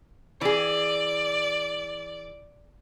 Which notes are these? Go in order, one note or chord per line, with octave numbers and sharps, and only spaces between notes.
E3 G#4 D5